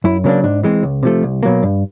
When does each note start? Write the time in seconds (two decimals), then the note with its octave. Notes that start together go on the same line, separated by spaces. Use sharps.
0.04 F#2 E4
0.24 C#3 F#3 A#3 D4
0.43 G#2 D4
0.63 E3 G#3 C4
0.83 C#2
1.03 C3 F3 A3
1.23 C2
1.43 B2 F#3 A#3
1.63 G2